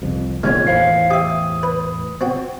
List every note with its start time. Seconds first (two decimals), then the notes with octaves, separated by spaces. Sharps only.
0.02 C2 F2
0.43 F1 A#2 D#3 G#3 C#4 F4 F6 G#6
0.67 E2 A2 E3 C5 F5 C7
1.11 G4 E5 D#6
1.63 B4
2.21 C4 F#4